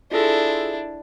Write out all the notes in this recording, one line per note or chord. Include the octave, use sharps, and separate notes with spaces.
D4 E4 F4 G#4 A4